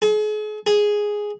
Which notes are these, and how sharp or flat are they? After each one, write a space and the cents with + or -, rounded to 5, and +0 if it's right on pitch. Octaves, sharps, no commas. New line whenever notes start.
G#4 +40
G#4 +0